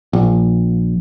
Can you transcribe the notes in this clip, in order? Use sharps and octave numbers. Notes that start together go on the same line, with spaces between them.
A#1